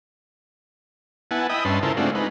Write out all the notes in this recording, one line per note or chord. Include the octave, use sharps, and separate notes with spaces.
B3 E4 F#5 G#5 A5
D#5 E5 G5 B5 D#6
G2 C#4 B4 A5 C6
C#3 E4 F4 A4 A#4 C5
G#3 A3 C4 D4 F4 F#4
G#3 D#4 B4